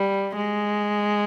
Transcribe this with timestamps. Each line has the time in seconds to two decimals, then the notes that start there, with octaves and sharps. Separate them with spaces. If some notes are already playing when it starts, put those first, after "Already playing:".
Already playing: G3
0.36 G#3